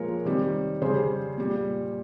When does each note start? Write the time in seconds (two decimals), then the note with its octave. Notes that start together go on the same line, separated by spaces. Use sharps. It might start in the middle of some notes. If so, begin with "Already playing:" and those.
Already playing: A#2 F3 G#3 A#4 C#5
0.25 C3 D#3 G3
0.82 C#3 G3 G#4 C5
1.38 A#2 G3